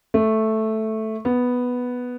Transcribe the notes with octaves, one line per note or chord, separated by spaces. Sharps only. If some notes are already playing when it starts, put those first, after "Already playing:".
A3
B3